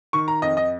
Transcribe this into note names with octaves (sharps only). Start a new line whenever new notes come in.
D#3 C#6
A#5
F2 D#5
D#5